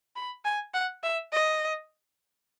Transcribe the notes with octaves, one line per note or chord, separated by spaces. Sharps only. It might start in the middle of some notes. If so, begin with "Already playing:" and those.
B5
G#5
F#5
E5
D#5